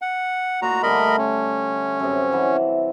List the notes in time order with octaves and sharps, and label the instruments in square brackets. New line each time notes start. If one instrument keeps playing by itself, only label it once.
[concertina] F#5
[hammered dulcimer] A#2 D#5 C6 [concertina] F#4 A#5
[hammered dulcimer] D3 G3 A3 [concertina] A#4 D#5 B5
[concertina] C#4
[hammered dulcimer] F#2 C3
E3 E5 F#5